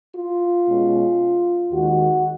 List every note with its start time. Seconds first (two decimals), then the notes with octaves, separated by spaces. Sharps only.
0.15 F4
0.67 B2 G#3 C#4
1.71 D#2 D#3 G#3 F#4